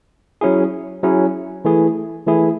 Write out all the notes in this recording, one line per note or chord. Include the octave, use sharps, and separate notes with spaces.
F#3 C#4 E4 G#4
F#3 C#4 E4 G#4
E3 A3 E4 G#4
E3 A3 E4 G#4